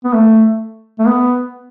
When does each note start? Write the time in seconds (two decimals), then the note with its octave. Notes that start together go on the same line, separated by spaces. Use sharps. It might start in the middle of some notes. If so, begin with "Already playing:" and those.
0.04 B3
0.13 A3
0.99 A3
1.07 B3